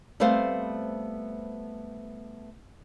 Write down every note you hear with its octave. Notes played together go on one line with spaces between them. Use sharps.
G3 A3 B3 C4 C5 F5